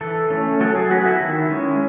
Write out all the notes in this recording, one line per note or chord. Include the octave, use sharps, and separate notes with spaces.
E3 A4
A3 C#4
F#3 A4
G#4
B3 F#4
E4
D#3
G#3 C#4